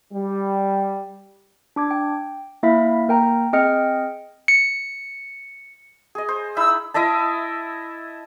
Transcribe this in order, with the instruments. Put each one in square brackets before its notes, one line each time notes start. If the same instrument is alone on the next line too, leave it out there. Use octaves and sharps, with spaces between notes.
[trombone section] G3
[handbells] D4 D6 G#6
G5
A#3 E4 E5 F5 B5 B6
A#3 A#4 G5 A#5
C4 G#4 D#5 G5 F6 C#7
C#7
[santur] G#4 D#5
C5
[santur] D#4 E4 B5 [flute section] E6
[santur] E4 D#5 E5 A5